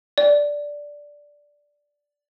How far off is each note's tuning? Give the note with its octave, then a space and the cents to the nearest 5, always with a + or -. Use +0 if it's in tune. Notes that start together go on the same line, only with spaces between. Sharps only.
D5 -5